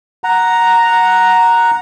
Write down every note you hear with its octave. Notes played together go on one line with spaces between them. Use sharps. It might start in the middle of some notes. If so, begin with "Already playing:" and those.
F#5 A#5